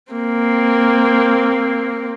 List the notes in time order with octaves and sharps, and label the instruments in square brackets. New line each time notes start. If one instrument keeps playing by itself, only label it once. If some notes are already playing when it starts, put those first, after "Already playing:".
[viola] A#3 C4